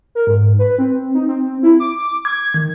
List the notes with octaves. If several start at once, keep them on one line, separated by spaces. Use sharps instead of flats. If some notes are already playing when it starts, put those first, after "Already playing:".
A#4
G#2
B4
C4
D#4
C4
E4
D6
G#6
D#3